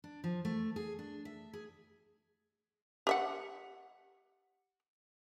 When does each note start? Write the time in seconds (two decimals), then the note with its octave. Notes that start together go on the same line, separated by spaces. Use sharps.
0.04 D4
0.24 F3
0.45 A3
0.76 G#4
0.99 D4
1.25 E5
1.53 G#4
3.07 G4 E5 F#5